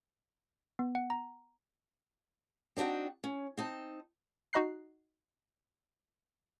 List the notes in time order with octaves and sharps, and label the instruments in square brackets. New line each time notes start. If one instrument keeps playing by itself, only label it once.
[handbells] B3
F#5
A#5
[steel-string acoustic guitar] C4 D4 D#4 F#4 G5
C#4
C4 D#4 A5
[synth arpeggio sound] D#4 F#4 D#5 A#5 F#6 C7